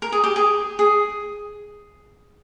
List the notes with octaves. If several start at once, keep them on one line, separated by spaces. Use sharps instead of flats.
A#4
G#4
G4
G#4
G#4